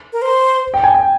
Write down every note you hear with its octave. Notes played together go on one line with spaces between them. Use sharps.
A#4
C5
G5
G#5
G5